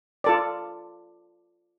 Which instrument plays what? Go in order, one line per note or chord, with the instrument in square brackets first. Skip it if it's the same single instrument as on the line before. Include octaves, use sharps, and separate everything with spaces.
[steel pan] F4 A4 D5